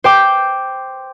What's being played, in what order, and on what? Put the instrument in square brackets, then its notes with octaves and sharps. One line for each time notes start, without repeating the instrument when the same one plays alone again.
[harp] C5 G5 D6